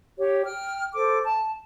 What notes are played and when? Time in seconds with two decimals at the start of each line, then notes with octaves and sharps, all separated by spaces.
0.18 G4 C#5
0.45 G5 F6
0.95 A4 C5 D6
1.25 A5